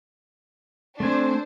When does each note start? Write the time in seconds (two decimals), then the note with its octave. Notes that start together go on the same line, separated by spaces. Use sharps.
1.00 A3 C4 D4 C5 G#5